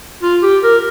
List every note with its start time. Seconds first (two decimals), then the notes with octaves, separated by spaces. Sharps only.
0.22 F4
0.43 G4
0.64 A#4